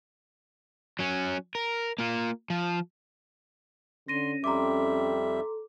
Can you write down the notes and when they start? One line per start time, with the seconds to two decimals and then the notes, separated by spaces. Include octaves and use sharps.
0.99 F#3 C#4
1.55 A#4
1.98 A#3 F4
2.50 F3
4.08 D3 C#4 C6 A#6 D#7
4.44 F2 G3 A4 E5 A#5 C6 D6